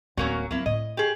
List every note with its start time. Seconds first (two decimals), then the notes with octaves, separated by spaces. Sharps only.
0.17 D1 F#3 A#3 C#4
0.51 F#3 A#3 C4 E4
0.66 A2 D#5
0.97 G4 G#4